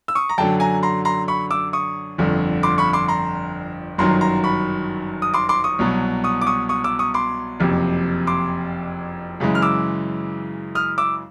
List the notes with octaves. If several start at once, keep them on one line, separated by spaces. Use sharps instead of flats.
E6
C#6 D#6
A#5
F#2 D3 F#3 G5 A5
G#5 A#5
A#5 C6
A#5 C6
B5 C#6
D6 E6
C#6 D#6
G1 F2 D3
C6 D6
B5 C#6
C6 D6
A#5 C6
G1 F#2 D#3 F#3 A#5 C6
A#5 C6
B5 C#6
D#6
C6 D6
C6 D6
C#6 D#6
C2 B2 F#3
C#6 D#6
D6
C#6 D#6
C#6 D#6
D6 E6
C#6 D#6
C6 D6
F#1 F2 C3
C6 D6
F#2 C#3 E3 G#3
F6
D6 E6
D#6 F6
D6 E6